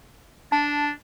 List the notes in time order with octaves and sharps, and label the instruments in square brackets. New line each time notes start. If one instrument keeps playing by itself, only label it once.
[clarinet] D4 [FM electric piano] A5